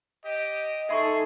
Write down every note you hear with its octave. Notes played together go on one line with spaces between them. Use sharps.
G4 D#5
D#4 G#4 A4 E5 C6 C#6